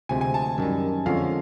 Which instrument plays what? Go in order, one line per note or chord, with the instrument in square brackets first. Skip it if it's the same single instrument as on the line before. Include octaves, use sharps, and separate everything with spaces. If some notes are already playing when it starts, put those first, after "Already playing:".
[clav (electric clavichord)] D2 C3 F3 G#3 C4 [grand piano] G#5
[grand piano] G#5
A5
[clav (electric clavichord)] F#2 D#3 G3
[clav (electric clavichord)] F2 D3 F3 G#3 C#4 [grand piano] F5